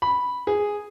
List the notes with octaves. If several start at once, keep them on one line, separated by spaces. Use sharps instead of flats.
B5
G#4